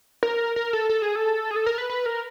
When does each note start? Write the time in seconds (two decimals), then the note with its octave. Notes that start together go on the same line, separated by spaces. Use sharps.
0.23 A#4
0.56 A#4
0.73 A4
0.89 A4
1.02 G#4
1.15 A4
1.51 G#4
1.56 A4
1.66 A#4
1.78 B4
1.90 B4
2.06 A#4